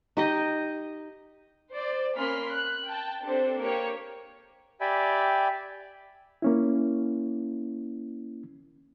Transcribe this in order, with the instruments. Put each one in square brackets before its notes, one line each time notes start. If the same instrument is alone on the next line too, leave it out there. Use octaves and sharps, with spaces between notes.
[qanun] D#4 G4 D#5
[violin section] C5 D5
A#3 C#4 B5 C6 F6 B6
F#6
G5 A5
C4 D4 G4 A4 C5
A#3 G4 C#5
[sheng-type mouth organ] G4 D5 E5 G5 G#5 B5
[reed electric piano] A#3 C#4 E4